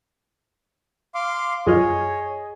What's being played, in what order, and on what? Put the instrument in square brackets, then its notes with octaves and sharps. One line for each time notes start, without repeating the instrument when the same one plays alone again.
[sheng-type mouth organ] F5 C6 D6
[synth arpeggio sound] F#2 F4 F6 [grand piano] G#4 D#5 [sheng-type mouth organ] C#5